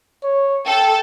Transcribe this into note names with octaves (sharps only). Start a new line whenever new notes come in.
C#5
A4 G5